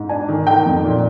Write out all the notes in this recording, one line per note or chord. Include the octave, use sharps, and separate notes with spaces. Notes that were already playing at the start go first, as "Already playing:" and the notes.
Already playing: G#2
D4 G#5
D#3
D#3 G5
F2
A#2